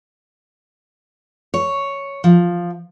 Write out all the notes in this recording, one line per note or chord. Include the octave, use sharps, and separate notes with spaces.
C#5
F3